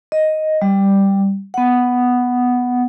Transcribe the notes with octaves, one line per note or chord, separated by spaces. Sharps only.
D#5
G3
B3 F#5